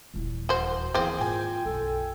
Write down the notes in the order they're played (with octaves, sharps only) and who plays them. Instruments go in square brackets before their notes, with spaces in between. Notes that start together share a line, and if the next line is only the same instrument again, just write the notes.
[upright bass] D#1 E2
[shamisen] F#4 C5
[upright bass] D#3 E3 [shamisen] A#3 C4 [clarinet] E4 [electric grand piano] G#4
[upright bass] G#2 [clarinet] F4 [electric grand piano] G5 G#5
[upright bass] B1 F#2 [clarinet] A4